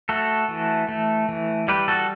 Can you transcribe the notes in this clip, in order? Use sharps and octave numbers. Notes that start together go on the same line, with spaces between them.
A3 F#4 A4
E3
A3
E3
G3 G4 B4
F#4 A4